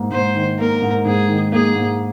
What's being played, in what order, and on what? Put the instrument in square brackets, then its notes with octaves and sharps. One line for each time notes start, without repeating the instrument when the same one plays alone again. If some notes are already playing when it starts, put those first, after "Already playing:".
Already playing: [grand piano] G#2 A#3
[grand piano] G#2 [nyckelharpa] C5
[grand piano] D#3
[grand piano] A#3 [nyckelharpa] A#4
[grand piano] G#2
[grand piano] G#2 [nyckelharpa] G#4
[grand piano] D#3
[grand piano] A#3 [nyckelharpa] G#4
[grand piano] G#2